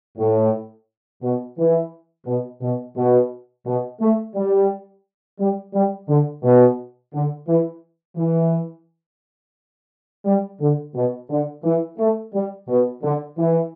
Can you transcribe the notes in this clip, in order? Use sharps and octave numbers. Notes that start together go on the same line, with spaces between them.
A2
B2
E3
B2
B2
B2
B2
A3
G3
G3
G3
D3
B2
D3
E3
E3
G3
D3
B2
D3
E3
A3
G3
B2
D3
E3